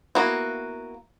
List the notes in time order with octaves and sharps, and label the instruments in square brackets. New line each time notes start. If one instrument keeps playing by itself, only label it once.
[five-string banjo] A#3 B3 E4 F#4